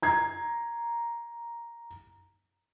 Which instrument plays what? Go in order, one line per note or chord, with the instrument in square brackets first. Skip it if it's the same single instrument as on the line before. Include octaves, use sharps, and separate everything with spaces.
[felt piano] A#5 G#6 C7